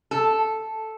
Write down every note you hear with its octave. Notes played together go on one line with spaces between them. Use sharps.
A4